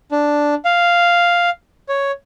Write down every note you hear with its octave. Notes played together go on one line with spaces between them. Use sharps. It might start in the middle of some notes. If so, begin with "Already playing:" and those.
D4
F5
C#5